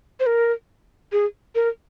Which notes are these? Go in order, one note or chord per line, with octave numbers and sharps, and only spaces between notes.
C5
A#4
G#4
A#4